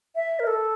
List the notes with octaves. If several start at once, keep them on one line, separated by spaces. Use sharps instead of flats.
E5
A#4
A4